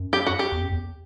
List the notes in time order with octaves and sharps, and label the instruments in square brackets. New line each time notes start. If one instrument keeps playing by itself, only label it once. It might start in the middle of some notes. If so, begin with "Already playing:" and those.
Already playing: [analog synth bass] F#2
[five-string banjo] G4
F#4
G4
[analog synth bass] E2
F#2
E2